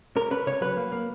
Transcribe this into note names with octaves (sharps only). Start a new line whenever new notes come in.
C#4 A#4
C#4 B4
C#3 C#5
F#3 B4
A#3
A#3